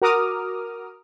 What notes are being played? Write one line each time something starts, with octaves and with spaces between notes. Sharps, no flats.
F#4 A#4 A#5 D6 D#6 F6